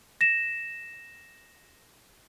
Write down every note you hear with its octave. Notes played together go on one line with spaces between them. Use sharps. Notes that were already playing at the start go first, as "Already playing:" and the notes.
A#6 E7